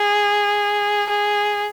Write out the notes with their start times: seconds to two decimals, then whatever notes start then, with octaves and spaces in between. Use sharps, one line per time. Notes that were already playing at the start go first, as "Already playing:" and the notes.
Already playing: G#4
1.09 G#4